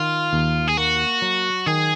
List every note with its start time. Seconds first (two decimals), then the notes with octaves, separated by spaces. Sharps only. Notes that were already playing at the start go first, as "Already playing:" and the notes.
Already playing: D#3 F4
0.33 D#2
0.68 G#4
0.77 A#3 F#4
1.22 F#3
1.66 D#3 G#4